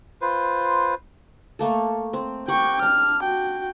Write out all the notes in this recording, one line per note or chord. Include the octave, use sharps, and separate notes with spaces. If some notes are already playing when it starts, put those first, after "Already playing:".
F4 B4 C5
A3 A#3 A4
C4
G4 A#4 F#5 G5 C#6
D4 F6
F#4 G5